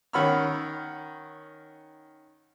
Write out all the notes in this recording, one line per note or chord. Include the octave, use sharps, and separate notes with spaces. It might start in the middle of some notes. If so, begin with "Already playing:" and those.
D#3 C#4 F#5 B5 E6 F6